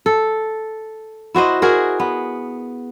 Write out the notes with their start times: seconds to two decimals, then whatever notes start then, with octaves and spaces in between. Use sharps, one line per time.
0.06 A4
1.35 E4 F#4 C5 D#5
1.62 F#4 G#4 A#4
2.00 B3